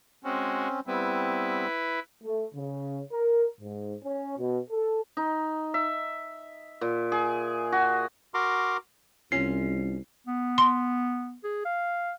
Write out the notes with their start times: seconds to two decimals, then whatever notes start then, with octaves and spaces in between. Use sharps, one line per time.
0.24 G#3 C4 C#4 F#4
0.87 G3 B3 C4 E4 B4
2.23 A3
2.55 C#3
3.11 A#4
3.60 G#2
4.04 C#4
4.38 B2
4.71 A4
5.17 D#4
5.74 E5
6.81 A#2
7.12 G#4
7.72 F#4
8.34 F#4 A#4 A#5 C6 D6
9.32 C2 C#4 F4 C7
10.27 B3
10.58 C6
11.44 G#4
11.65 F5